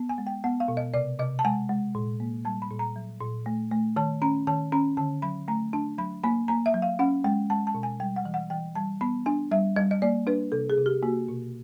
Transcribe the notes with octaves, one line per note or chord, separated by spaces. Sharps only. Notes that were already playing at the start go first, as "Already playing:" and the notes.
Already playing: B3
G#5
G#3
G5
B3 F#5
F5
B2
D#5
C3 D5
C3 D#5
A5
G#3 G#5
G#3
A#2
A#3
G3 A5
B5
A#2
A#5
F#3
A#2
A3
A3
D#3 A5
C#4 A#5
D#3 A5
C#4 A#5
D3 A5
F#3 B5
A3 A#5
D4 A5
F#3 B5
A#3 B5
A#3 A#5
E5
F#3
F5
C#4 F#5
G#3 G5
G#3 A5
A5
B2
G#5
G3 G5
F#5
E3
F#5
E3 G5
G3 A5
B3 B5
D4 G#5
G3 E5
G3 D#5
D#5
A#3 D5
D4 B4
C3 A4
G#4
C3
G4
A#3 F#4
B2